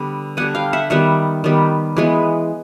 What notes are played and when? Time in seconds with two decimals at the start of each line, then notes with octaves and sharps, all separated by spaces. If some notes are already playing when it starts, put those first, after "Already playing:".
Already playing: D3 G3 B3
0.37 D3 G3 B3 F#5 G#5
0.55 F5 G5
0.73 E5 F#5
0.90 D#3 G3 B3 E5 F#5
1.44 D#3 G3 B3
1.97 E3 G#3 B3